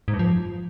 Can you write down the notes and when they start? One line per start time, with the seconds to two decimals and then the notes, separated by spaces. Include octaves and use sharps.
0.08 G#2
0.14 G2
0.19 F3